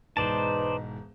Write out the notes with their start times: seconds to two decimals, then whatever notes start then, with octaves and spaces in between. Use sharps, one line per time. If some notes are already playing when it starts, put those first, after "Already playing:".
0.17 E1 G#2 D#4 B4 C5 D5 A5 E7